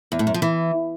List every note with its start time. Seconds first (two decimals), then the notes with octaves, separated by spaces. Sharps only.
0.12 E2
0.19 A2
0.27 F#2
0.34 F3
0.42 E3